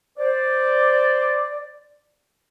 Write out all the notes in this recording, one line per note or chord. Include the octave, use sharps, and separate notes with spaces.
C5 D5